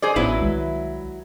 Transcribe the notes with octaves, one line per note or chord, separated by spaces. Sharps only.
G#4 C5 D5
A1 F#3 B3 C#4 E4 B4
C2 D#3 G#3